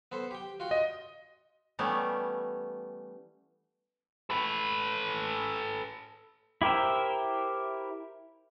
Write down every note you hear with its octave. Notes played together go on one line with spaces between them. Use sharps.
B3 A4 C5
G4 G5
F4 F#4 G5
D#5
E3 G3 A3 B3 C#4
A4 B4
E4 G4 A#4 C5 E5